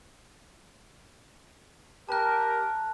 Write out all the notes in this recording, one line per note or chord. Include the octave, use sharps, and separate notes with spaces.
G4 A#4 A5 F#6